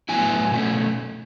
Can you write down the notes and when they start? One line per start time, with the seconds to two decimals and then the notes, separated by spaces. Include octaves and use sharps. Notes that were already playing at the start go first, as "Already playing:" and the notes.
0.09 A2 F#3 B3 E4 G#5
0.51 B2 A3 C#4